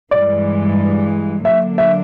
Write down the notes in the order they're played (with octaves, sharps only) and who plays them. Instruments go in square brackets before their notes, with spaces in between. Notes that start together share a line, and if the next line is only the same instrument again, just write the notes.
[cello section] G2 E3 G#3 [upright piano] D5
[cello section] D3 F#3 A#3 D4 [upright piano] E5
[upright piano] E5